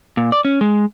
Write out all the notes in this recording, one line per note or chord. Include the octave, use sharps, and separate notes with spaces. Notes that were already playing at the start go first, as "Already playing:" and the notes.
A#2
D5
C#4
G#3